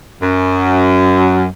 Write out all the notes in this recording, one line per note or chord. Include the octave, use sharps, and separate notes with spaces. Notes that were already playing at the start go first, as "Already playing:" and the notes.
F#2